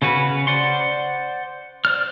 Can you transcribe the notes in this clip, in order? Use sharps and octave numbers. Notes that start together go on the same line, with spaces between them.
C#3 C#4 F#4 B4
C5 D5 F#5 C6
C5 D5 F6